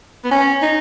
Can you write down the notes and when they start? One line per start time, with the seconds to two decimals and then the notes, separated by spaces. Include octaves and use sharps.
0.25 B3
0.31 C#4
0.62 D#4